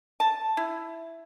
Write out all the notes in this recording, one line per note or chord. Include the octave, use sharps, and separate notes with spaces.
A5
E4